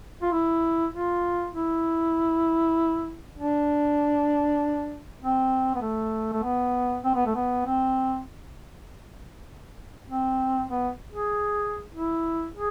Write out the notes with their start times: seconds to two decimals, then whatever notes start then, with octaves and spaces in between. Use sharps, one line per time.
0.22 F4
0.32 E4
0.93 F4
1.54 E4
3.38 D4
5.21 C4
5.75 B3
5.82 A3
6.33 A3
6.43 B3
7.04 C4
7.15 B3
7.26 A3
7.35 B3
7.66 C4
10.10 C4
10.71 B3
11.12 G#4
11.94 E4
12.55 G#4